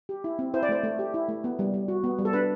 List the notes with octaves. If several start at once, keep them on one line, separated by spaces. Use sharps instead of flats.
G4
E4
C4
E4 C5
D5
A3 C5
A3
G4
E4
A3
B3
G3
G3
F#4
B3
G3
A4
D4 B4